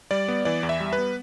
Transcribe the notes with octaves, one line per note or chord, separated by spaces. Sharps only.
G3 D5
B3
E3 D5
E2
E5
G3
B4
B3